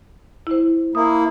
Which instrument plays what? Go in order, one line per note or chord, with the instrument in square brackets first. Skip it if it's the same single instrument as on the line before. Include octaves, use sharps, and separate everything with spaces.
[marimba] E4 C5
[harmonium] A#3 E4 [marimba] D#6